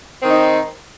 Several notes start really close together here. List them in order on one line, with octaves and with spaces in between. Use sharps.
C4 D#3 D#4